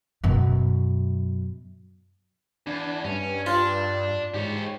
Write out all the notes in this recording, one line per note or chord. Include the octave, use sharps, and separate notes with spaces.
F#2 B2
E2 D4
G2 C#4
D4 F4
G#2 G4 C#5